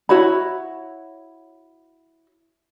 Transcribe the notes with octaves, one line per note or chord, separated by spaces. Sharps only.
E4 F#4 C#5 B5